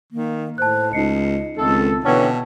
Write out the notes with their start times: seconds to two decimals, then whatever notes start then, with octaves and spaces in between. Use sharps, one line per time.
0.12 D#3 A#3
0.58 A2 C5 A5 F#6
0.93 C#2 D#4 D#5 C7 C#7
1.57 C#2 D#3 A3 C4 A4
2.05 B2 D3 E3 C#4 G5 A5